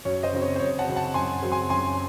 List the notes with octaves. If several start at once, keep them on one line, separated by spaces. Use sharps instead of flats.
F#2 C#5
C5 D#5
C#3 F#3 C4
C#5
C5
F#2 C#5
F#5 A5
C#3 F#3 C4
F#5 A5
F#2 G#5 C6
C#3 F#3 C4
G#5 C6
F#2 G#5 C6